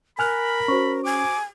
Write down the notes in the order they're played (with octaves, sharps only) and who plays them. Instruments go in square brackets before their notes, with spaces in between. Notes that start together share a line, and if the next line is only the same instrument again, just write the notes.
[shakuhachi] A#4 [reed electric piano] G#5 F6 F#6 [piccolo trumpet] B5
[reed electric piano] C#4 [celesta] F#4 C5 C#6
[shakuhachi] G#5 [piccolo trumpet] D6